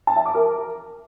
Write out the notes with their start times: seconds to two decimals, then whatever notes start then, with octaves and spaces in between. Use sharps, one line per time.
0.07 A5
0.16 E5
0.26 D6
0.35 A#4